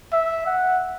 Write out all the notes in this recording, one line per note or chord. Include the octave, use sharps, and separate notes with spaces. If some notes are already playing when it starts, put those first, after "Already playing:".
E5
F#5